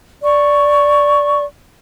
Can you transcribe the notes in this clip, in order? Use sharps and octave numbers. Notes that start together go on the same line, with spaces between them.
D5 C#6